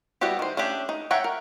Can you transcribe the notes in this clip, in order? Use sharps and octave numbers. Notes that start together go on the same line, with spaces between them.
G3 B3 E4 F#4 G4
D#3 C5
A3 C#4 D4 G4
D#4
C#5 E5 F#5 G5 A#5
A#4